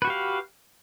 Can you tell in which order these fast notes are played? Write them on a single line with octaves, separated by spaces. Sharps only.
B4 F#4 G4 F5